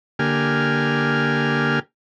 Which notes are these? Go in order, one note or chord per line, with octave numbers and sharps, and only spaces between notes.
D3 A#3 G4 G#5 F6